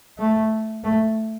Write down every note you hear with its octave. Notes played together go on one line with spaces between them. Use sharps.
A3
A3